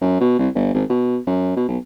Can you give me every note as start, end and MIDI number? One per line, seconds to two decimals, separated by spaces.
0.01 0.18 42
0.21 0.35 47
0.39 0.49 36
0.55 0.73 31
0.74 0.84 32
0.90 1.18 47
1.27 1.55 42
1.57 1.66 47
1.68 1.78 35